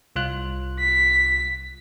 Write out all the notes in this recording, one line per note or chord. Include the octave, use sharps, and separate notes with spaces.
C2 F4 F#6
B6